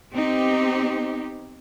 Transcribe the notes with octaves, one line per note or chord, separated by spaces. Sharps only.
B3 C4 D#4 G4